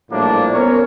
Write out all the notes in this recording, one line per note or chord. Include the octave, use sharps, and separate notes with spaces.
A#1 A2 F3 G3 A#3 D4
B3 C#4 A#4 C5 C#5